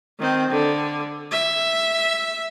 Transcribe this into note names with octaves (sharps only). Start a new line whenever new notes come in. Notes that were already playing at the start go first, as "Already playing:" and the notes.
D#3 C4
D3
E5